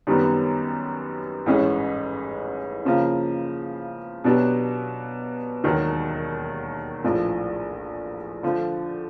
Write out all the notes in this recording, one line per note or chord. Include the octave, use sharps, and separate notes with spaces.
F#2 D#3 G3 B3 D#4
A1 G#2 E3 G#3 C#4
C#3 F3 A#3
B2 F#3 B3 D4 G4
E1 D#2 D#3 F#3
A#1 A2 F3
D3 F3 A3